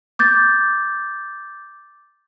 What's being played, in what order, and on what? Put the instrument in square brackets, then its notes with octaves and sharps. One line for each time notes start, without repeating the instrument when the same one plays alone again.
[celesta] D6 G6 A6